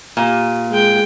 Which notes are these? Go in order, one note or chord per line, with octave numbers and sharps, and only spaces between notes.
A#2 G4
G#3 G5